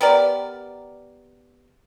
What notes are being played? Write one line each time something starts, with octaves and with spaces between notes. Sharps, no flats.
B3 G4 A#4 D5